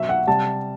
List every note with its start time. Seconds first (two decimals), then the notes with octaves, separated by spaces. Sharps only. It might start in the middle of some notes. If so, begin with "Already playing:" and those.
Already playing: B2 F#3 E5
0.09 F#5
0.27 C3 G3 A5